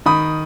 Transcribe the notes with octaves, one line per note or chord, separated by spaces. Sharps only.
D#3 B5 D#6